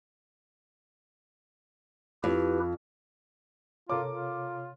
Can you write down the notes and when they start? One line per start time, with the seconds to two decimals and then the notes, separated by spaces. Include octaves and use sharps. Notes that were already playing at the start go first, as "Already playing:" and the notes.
2.24 F2 E4 G4 B4
3.90 C3 F4 A4 A#4 C#5 D6
4.09 F4